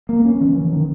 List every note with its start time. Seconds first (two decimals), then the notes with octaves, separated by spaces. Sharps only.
0.09 A#3
0.25 C#4
0.41 E3
0.57 E3
0.73 D#3